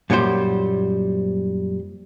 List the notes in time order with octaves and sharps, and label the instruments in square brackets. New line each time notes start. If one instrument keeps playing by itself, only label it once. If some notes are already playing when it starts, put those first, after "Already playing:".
[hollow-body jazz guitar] F#2 A#2 F#3 G3 C5